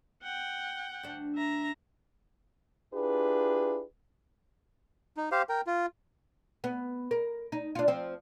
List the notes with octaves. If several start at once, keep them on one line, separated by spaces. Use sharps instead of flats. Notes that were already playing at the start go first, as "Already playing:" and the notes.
F#5 G5
D2 D4
E5 A#5
D4 E4 F4 G4 G#4 B4
D#4
G4 C5 F5
A#4 G5
F4
B3
A#4
D#4
D4 F4
F3 C4